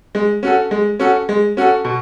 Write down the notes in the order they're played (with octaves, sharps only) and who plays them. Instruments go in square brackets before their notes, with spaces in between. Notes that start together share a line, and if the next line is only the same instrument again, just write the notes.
[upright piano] G#3
C#4 F#4 A4
G#3
C#4 F#4 A4
G#3
C#4 F#4 A4
B2